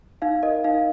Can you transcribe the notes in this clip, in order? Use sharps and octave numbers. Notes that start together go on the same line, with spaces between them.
D#4 F5
A#4 D#5
D#4 F5